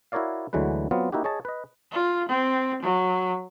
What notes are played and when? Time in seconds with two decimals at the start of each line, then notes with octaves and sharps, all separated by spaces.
0.12 E4 F#4 A#4 C#5 D5 F5
0.53 D2 D3 E3 F#3 G#3 B4
0.91 F#3 B3 C4 F4
1.12 A#3 D#4 E4 F#4 G4
1.24 G#4 C#5 D#5 A5
1.45 B4 D#5
1.92 F4
2.29 C4
2.82 F#3